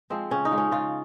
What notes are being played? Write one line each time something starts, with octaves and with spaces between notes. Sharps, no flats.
F3 G#3 C4
C#3 C#4
D#4
F3 G#3
C#4
C#3 F4